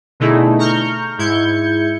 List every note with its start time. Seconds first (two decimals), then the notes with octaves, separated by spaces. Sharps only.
0.20 B2 D3 A3 D#4 E4 G#4
0.59 A#5 C#6 F6 G6
1.18 G#2 E4 G6 G#6 C#7